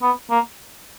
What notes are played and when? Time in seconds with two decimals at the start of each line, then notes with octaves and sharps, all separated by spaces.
0.02 B3
0.30 A#3